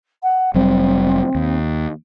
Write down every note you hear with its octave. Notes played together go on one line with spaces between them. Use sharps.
F#5
F1 F#3 G3 C4
D#2